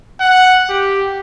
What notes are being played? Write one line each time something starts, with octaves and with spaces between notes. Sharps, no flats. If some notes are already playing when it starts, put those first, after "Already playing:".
F#5
G4